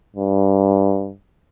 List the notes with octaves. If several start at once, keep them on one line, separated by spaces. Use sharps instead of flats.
G2